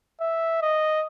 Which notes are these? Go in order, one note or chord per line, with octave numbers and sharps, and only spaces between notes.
E5
D#5